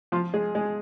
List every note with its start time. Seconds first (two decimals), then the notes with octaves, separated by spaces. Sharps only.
0.12 F3 F4
0.34 G#3 G#4
0.55 G#3 G#4